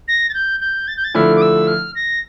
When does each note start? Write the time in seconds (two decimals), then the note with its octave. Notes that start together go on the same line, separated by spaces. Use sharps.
0.08 A#6
0.30 A6
0.34 G6
0.60 G6
0.88 A6
0.97 G6
1.04 A6
1.14 D3 F3 A3 E4 F6
1.36 D6
1.42 E6
1.67 F6
1.95 A#6